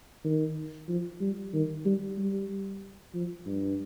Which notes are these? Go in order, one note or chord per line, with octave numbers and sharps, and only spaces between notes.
D#3
F3
G3
D#3
G3
G3
F3
G2